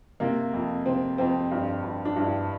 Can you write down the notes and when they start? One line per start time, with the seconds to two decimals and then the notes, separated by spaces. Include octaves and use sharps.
0.20 C3 A#3
0.53 F2
0.86 C3 C4
1.18 F2 C4
1.51 G2
1.84 G2
2.05 D4
2.16 G2 E4